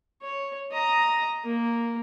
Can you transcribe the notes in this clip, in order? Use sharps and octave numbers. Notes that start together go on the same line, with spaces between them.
C#5
D#5 A#5
A#3